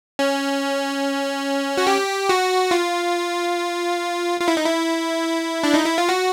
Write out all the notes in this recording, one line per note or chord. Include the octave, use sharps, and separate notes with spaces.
C#4
F#4
G4
F#4
F4
F4
E4
D#4
E4
D4
D#4
E4
F4
F#4